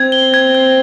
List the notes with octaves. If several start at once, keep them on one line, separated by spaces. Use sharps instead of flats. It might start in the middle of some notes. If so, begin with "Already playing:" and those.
Already playing: C4 G#6
G7
G#6
G#6